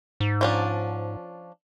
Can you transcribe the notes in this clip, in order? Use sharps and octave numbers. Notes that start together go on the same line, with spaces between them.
G#2
F3 C#4 D4